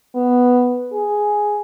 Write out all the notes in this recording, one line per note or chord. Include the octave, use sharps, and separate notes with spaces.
B3
G#4